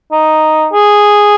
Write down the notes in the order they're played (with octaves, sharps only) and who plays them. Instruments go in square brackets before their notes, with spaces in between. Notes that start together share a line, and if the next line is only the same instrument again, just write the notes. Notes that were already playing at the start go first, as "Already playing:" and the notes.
[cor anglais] D#4
G#4